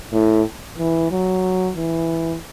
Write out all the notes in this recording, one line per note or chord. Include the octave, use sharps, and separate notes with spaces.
A2
E3
F#3
E3